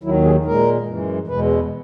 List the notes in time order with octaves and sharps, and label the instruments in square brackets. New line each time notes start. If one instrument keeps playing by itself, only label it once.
[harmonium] D#2 D#3 F#3 E4
G#4
A#2 G#3 A#4
F#2 E3 G#3
E2 B2 G#3 B4